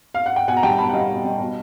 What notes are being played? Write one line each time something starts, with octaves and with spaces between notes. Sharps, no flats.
F5
F#5
G5
B2 F#5 G#5
A#5
G3 G5 A5
B2 A5 B5
F#5
G3 D#5 F5
B2
G3
B2